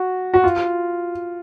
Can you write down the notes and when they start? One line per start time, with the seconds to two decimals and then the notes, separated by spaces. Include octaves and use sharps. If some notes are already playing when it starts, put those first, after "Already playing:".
Already playing: F#4
0.34 F#4
0.44 F4